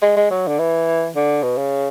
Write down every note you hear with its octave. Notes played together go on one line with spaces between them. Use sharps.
G#3
G#3
F#3
D3
E3
D3
B2
C#3